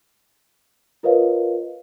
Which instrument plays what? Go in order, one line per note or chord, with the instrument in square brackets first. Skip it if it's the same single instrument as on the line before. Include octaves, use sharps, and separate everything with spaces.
[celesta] F4 A#4 B4 C#5 D#5 F5